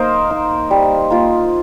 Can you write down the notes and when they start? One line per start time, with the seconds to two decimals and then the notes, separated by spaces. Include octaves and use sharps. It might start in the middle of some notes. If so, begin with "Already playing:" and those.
Already playing: A#3 D#4 A#4 C5 D#5 F5
0.31 D#4
0.71 G3
1.10 A#3 F4